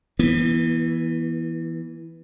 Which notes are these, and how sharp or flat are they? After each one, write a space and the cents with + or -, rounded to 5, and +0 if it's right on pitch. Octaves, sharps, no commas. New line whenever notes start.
E3 -5 B3 -35